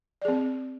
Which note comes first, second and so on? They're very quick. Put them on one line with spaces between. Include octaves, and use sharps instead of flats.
D5 G#4 C4